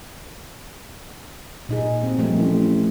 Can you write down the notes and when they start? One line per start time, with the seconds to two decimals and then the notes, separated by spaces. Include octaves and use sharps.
1.69 A#2 D#4 G#4
2.03 C4
2.19 F3 G3 A3
2.38 A1